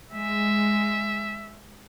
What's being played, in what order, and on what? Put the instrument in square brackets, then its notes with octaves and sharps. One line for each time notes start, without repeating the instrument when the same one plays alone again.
[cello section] G#3 [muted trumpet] E5